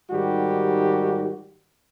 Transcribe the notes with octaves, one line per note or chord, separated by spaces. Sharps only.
G#2 D#3 G3 F#4 G4